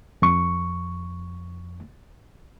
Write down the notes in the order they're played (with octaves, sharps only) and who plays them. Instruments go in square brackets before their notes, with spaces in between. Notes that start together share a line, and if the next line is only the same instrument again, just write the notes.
[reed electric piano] F2 C#6